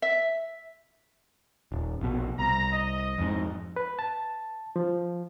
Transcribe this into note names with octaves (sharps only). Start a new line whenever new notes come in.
E5
D#1
A#1 B2
C2 A#5
D#5
F2 G#2
B4
A5
F3